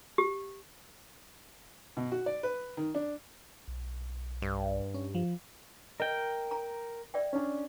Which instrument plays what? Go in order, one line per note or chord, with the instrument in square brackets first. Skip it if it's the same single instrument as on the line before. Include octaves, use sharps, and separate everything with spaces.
[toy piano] G4
[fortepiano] B2
F#4
D5
B4
D#3
D4
[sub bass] B1
[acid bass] G2
[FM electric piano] C#4
F3
[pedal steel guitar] A#4 G5 [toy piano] D#5
[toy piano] A#5
D5 E5 G5
[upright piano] C#4 D4